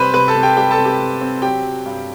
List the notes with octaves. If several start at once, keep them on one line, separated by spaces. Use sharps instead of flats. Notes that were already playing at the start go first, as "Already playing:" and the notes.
Already playing: C3 G3 B4 C5 B5 C6
C3 B4 B5
A4 A5
C3
G4 G5
G3 G4 G5
A4 A5
C3
G4 G5
C3
C4
F#3 G4 G5
F#3
G2